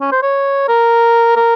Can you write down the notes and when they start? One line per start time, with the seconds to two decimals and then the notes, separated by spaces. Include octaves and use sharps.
0.01 C#4
0.12 C5
0.23 C#5
0.68 A#4
1.36 A#4